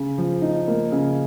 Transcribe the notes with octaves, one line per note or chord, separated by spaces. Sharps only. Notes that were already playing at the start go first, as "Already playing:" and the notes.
Already playing: C#3
F3
D#4
A#3
C#3